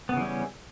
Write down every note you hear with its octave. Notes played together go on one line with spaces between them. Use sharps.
C#3 E3 G3 B3 C#4